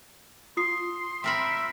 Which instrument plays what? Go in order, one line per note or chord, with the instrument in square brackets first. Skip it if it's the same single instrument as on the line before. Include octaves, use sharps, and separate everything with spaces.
[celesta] F4 D#6 C7 [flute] C6
[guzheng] C4 A#4 B5 [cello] E5